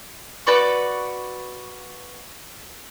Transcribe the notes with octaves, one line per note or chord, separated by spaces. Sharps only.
F#4 B4 D5 C#6